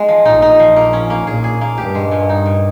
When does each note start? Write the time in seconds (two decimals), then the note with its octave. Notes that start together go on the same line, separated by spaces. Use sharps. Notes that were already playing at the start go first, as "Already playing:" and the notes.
Already playing: G#3 D#4
0.09 F3
0.25 A#1 A#2 D#4
0.42 D#4
0.59 F3
0.76 A#3
0.93 C#4
1.10 A#3
1.27 A#1 A#2 G#4
1.44 G#4
1.61 A#3
1.78 G2 G4
1.95 G#3
2.11 A#2
2.29 D#4
2.46 A#2